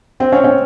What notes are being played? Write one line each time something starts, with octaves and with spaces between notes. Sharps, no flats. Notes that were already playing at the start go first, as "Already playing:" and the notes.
C4 C5
C#4 C#5
C#4 C#5